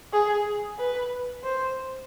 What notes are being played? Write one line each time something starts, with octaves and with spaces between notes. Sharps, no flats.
G#4
B4
C5